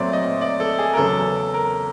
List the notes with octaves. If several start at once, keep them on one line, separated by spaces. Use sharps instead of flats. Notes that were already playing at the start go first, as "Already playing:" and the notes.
Already playing: A#2 F#3 A3 C4 D5
D#5
D5
A4
G#4
A#4
E2 C#3 F#3 A4
A#4